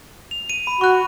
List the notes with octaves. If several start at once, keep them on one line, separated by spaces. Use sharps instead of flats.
F7
D#7
B5
F#4 C#6 F#6